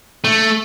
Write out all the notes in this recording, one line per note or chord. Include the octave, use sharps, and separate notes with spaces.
A3